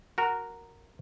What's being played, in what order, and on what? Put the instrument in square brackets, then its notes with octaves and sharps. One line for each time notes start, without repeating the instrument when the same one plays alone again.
[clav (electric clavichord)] F#4 A#4